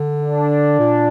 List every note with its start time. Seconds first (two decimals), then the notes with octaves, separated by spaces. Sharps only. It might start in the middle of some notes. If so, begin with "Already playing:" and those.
Already playing: D3
0.22 D4
0.79 A#2